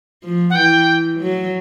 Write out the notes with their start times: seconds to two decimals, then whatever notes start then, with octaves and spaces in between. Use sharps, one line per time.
0.24 F3
0.50 F#5
0.55 E3 G5
1.20 F#3